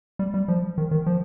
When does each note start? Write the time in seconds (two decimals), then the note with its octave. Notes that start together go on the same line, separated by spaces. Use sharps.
0.19 G3
0.34 G3
0.48 F3
0.78 D#3
0.91 D#3
1.06 F3